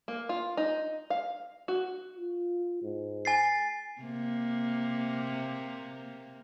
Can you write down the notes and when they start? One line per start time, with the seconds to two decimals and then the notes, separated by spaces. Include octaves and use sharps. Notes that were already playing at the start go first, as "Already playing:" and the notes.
0.08 A#3
0.29 F4
0.57 D#4
1.10 F5
1.68 F#4
2.17 F4
2.83 G#2
3.25 G#5 A6 C7
4.01 C3 A#3